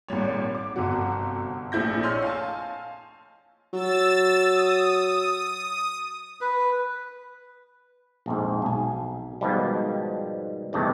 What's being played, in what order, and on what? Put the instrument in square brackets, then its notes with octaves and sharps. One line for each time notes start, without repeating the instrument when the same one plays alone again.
[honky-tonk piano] G#1 A#2 G3 C#5
D6
G1 C3 F#4
A#1 A3 C4 E4 G6 A#6
C#5 D#5 C6 C#6 E6 F6
F5 G#5 A5
[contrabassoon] F#3 [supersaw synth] E6 A6
[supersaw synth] D#6
[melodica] B4
[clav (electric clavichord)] A#1 F2 G#2
B1 G#5
G#2 B2 D#3 F3 G3
E2 G2 C3 D#3 A3 G5